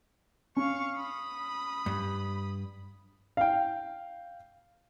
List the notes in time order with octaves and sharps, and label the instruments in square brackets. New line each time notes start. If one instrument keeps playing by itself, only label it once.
[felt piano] C#4 [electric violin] F5 C#6
[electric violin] B5 D#6
[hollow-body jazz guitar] G2
[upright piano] F5 G5